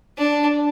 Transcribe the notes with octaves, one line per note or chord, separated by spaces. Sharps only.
D4